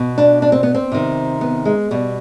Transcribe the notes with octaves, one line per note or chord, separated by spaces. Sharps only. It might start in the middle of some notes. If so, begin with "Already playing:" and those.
Already playing: B2
D4
D4
C4
B3
C4
C3 D#3
B3
G#3
B2 G3